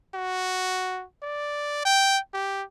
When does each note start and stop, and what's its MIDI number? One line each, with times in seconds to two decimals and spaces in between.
0.15 1.04 66
1.23 1.84 74
1.85 2.19 79
2.33 2.63 67